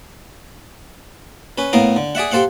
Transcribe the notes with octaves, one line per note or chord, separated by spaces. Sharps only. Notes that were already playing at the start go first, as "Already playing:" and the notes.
C#4 B4
A2 B3 A#4 F5
D3
G#4 D5 E5 F#5
G4 A4 C5 F5 F#5